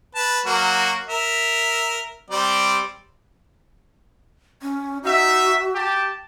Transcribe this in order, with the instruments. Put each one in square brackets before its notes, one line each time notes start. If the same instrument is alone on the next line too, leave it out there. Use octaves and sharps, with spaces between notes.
[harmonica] B4 A5
F#3 A#3 F#4
A#4 E5
G3 C4 D5
[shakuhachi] C#4
[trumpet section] D#4 E5 [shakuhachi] F#4
[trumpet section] G4 A5